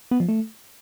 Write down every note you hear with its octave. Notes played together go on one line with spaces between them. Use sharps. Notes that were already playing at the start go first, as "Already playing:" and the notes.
B3
F3
A3